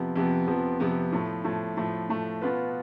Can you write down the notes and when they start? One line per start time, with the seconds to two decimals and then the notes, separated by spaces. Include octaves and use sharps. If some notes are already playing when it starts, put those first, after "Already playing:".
Already playing: F2 C3 F3 B3
0.16 F2 C3 F3 B3
0.48 F2 C3 F3 B3
0.80 F2 C3 F3 B3
1.12 A2 F3 A3
1.44 A2 F3 A3
1.77 A2 F3 A3
2.09 A2 F3 A3
2.42 B2 B3 F4 B4